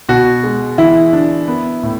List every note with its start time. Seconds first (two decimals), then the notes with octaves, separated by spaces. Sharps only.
0.09 B2 F#4
0.43 G#3
0.78 E3 E4
1.13 D4
1.48 B3
1.83 A2